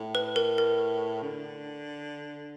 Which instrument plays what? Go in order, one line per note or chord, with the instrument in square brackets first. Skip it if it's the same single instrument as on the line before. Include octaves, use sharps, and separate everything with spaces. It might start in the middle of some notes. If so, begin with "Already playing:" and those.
Already playing: [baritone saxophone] A2
[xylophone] B4
A#4
A#4
[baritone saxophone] D3